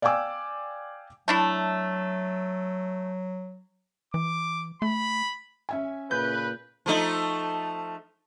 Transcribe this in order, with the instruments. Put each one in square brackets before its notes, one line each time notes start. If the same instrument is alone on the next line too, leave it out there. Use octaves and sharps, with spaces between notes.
[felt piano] D5 F5 G5 G#5 D6 E6
[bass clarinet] F#3 [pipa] A3 D4 E4
[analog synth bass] E3 [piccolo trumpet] D6
[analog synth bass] A3 [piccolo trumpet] B5
[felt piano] C#4 E5 G#5
[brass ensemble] A#2 C#3 B4 [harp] G6
[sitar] F3 A3 D#4